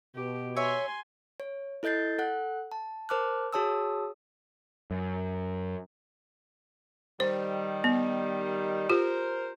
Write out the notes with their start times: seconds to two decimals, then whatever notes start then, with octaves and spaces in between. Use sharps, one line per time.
0.15 B2 G4
0.56 C#5 E5 G#5 C6
1.40 C#5
1.83 E4 A4 D#5 G6 A6 C7
2.19 A4 F#5 F#6
2.72 A5
3.09 A#4 C5 A5 D6 F6 F#6
3.52 F#4 G#4 C#5 A5 D#6 E6
4.91 F#2
7.20 D#3 G3 C5
7.84 B3
8.90 F4 G4 A#4 C5